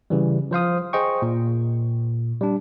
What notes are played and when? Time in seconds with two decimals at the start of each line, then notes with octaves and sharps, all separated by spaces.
0.10 C#3 E3 G3
0.51 F3 C5 F5 D#6
0.93 G#4 C5 D#5 G5 C#6
1.22 A#2
2.41 G3 D4